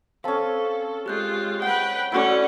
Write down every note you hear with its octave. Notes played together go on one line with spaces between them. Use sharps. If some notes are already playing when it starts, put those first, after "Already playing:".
C4 C#4 A4 F5 A5
G#3 F4 G4 F#6 G6
B4 F#5 G5
A3 C#4 E4 F#4 D5